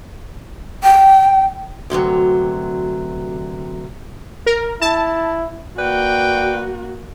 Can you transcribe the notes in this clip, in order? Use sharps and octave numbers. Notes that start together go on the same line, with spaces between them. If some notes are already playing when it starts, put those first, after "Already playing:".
G5
D2 G2 C3 F#3
A#4
E4 A5
A#3 F#4 B4 D5 G5